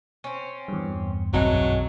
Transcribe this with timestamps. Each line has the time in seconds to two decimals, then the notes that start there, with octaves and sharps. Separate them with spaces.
0.24 C4 C#4
0.68 E2 G2
1.33 F#1 B1 E3 F#3 G#3 A3 C4